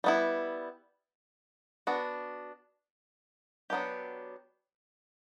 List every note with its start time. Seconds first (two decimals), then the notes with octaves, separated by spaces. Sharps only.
0.04 G3 B3 E4
1.87 B3 D4 F#4
3.70 F#3 B3 D4 G4